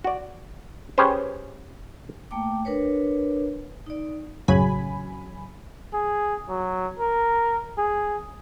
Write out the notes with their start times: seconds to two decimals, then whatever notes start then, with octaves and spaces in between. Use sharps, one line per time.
0.04 F#4 D5
0.98 C#4 G4 G#4 B4 C5
2.31 A3 A#3 G5 D6
2.65 D4 A#4 B4 C#5
3.86 D#4 D5
4.48 A1 F#2 C#3 F#3 G#5 B5
5.93 G#4
6.49 F#3
6.99 A#4
7.77 G#4